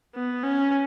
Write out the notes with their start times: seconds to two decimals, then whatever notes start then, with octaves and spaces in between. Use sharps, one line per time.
0.15 B3
0.43 C#4